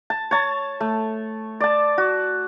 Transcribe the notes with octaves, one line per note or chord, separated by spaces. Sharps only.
A5
C#5 A5
A3
D5 A5
F#4